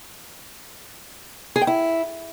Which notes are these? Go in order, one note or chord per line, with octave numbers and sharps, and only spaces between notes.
G#4
G5
E4